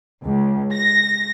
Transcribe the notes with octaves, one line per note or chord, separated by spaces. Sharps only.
C#2
A#6